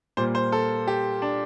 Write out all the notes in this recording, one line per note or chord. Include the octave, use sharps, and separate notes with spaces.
A#2 G3 A#3 C5
C5
A4
G4
D4